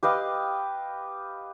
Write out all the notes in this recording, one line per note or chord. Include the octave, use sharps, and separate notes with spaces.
G4 B4 D#5 F5